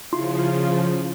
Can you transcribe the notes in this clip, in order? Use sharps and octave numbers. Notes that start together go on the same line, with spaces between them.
C#3 F3 E4 F4 C6